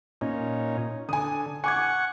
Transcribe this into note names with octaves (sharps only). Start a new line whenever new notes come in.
A#2 C#4 D#4
D3 G#5 D#6
F#5 G#5 C#6 D6 G#6